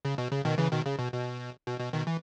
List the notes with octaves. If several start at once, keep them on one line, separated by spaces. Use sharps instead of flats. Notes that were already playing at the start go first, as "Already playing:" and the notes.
C#3
B2
C#3
B2 D#3
C#3 E3
B2 D#3
C#3
B2
B2
B2
B2
B2 D#3
E3